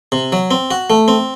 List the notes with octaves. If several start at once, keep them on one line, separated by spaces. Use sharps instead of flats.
C3
F#3
C4
F#4
A3
C4